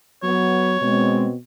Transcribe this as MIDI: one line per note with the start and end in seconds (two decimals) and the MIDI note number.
0.23 0.76 54
0.23 0.75 59
0.23 1.33 73
0.81 1.36 47
0.81 1.26 56
0.81 1.31 60